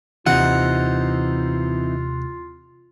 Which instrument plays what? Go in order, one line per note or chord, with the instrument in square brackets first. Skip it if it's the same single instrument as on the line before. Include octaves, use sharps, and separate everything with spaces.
[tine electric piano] D#2 C3 [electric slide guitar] E3 C4 D#4 [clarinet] F4 [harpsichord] F#5